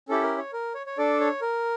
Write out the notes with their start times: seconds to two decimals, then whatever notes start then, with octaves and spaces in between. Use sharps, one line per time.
0.09 C#4 E4 G4 A4
0.23 A#4
0.38 C#5
0.53 A#4
0.75 C#5
0.87 C#5
0.98 D4 A4 D5
1.20 C#5
1.41 A#4